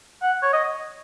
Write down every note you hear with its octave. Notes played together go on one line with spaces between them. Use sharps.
F#5
C#5
D#5